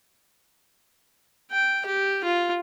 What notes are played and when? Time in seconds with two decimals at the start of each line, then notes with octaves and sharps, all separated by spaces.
1.51 G5
1.86 G4
2.24 F4